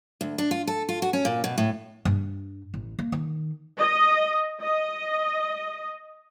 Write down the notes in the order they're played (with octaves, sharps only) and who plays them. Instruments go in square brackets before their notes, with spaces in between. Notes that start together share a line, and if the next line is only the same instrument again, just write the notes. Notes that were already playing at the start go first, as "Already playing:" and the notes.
[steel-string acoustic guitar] D2
D4
F4
A4
F4
F#4
C#4
A#2
B2
A2
[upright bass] G2
A1
A#3
D#3
[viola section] D#5
D#5